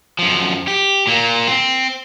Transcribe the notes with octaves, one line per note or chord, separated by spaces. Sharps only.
F#2 F3
G4
A#2 A#3
C4